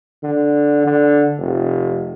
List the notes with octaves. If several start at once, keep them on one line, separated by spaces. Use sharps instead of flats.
D3
D3
F1